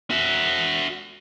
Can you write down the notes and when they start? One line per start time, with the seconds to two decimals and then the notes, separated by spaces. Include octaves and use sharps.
0.10 F#4 E5